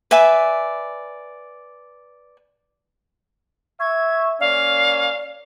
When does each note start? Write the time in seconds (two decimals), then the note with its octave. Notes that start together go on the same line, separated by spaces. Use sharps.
0.11 B4 D5 E5 G#5
3.80 E5 C#6 G#6
4.40 A#3 C#4 D5 F5